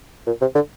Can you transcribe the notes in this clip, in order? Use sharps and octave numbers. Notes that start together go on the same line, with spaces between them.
A#2
C3
D3